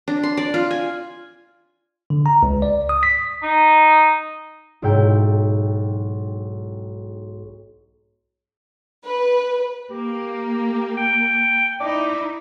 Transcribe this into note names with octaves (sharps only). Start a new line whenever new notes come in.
D4
C6
D5
F4
G#5
D3
A#5
C#2
D5
D#6
B6
D#4
B1 G#2 E4 G5
B4
A#3 G4
G5
D#4 E4 D5